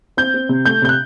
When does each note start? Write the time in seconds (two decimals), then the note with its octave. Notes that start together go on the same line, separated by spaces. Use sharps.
0.17 C4 G6
0.34 C4
0.49 C3
0.66 A3 G6
0.82 C3 G6
0.89 F#6